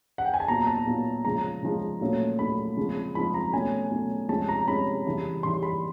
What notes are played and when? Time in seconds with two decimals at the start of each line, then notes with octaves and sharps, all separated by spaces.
0.18 F#5
0.25 G5
0.34 G#5
0.40 A5
0.48 A#2 F#3 B3 A#5
0.67 A5
0.87 A#2 F#3 B3
1.24 C#3 F3 G#3 A#5
1.63 C#3 F3 G#3
2.01 A#2 F#3 A3 C#4
2.39 A#2 F#3 A3 C#4 B5
2.77 C#3 F3 G#3 C4
3.15 C#3 F3 G#3 C4 B5
3.34 A#5
3.53 B2 F#3 A3 C#4 G#5
3.91 B2 F#3 A3 C#4
4.29 C3 F3 G#3 C#4 A5
4.49 A#5
4.67 C3 F3 G#3 C#4 B5
5.06 C#3 E3 G3
5.43 C#3 E3 G3 C6
5.63 B5